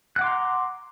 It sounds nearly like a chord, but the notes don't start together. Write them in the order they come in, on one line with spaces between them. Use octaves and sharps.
F#6 F#5 D6 C6 A#5